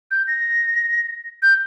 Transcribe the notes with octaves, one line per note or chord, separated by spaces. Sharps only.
G6
A#6
G6